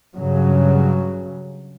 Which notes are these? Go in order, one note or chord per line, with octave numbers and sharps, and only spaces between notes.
G2 C#3 F#3